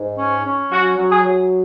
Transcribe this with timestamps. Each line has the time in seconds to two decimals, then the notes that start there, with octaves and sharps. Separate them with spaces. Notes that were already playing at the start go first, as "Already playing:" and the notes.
Already playing: G#2
0.18 C#4
0.45 C#4
0.71 F#3 F#4
0.97 F#3
1.10 G#4
1.23 F#3